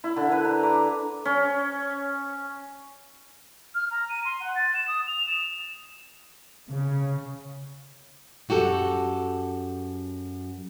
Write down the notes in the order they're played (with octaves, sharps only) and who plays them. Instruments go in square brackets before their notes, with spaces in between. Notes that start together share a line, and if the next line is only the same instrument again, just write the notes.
[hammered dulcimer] E4
D3
B4
A#5
D6
C#4
[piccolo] F6
A#5
D#7
C6
F#5
A6
E7
D#6
F7
E7
[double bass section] C#3
[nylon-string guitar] F#2 F#4 G4 A4